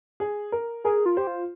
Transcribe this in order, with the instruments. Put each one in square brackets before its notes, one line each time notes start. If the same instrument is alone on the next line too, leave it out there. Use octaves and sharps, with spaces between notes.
[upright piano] G#4
A#4
[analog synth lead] G#4 [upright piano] A#4
[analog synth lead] F4
[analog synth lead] G4 [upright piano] C5
[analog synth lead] F4